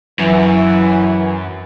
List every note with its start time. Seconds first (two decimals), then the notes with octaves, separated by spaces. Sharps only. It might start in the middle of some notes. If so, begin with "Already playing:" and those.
0.20 F#2 E3